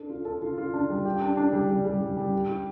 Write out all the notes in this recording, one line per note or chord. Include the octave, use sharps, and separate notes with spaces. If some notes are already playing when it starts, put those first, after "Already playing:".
Already playing: D4 A4
F4
A4
F4
F4
D4
G3
G4
D4
D4
G3
G3
G3
G3
G3
G4
G4